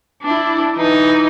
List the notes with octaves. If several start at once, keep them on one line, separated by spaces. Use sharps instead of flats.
D4 E4
E3 D#4